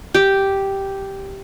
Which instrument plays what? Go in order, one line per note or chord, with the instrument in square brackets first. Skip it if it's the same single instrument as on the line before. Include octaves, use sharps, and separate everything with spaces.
[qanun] G4